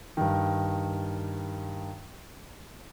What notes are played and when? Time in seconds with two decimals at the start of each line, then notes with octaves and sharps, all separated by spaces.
0.17 G2 D#3